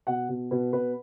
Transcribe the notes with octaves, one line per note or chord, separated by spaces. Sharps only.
B2 F#5
B2
B2 B4
B2 B4